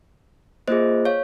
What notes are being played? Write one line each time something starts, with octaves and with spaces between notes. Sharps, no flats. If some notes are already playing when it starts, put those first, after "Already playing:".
A#3 F4 G#4 C5 D#5
C#5 F5